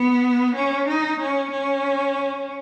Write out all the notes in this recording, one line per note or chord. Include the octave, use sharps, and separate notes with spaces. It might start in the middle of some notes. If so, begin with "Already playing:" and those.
Already playing: B3
C#4
D#4
C#4
C#4